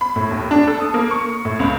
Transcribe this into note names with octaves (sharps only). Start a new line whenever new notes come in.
B5
A2
D#2
D4
A4
D#6
A#3
C#6
A2
C#2